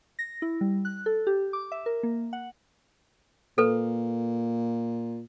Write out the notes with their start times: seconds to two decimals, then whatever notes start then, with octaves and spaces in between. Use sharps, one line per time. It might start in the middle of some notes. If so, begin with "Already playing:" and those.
0.19 A#6
0.42 E4
0.61 G3
0.85 F#6
1.06 A4
1.27 G4
1.53 D6
1.72 E5
1.86 A#4
2.03 A#3
2.33 F#5
3.58 A#2 A4 B4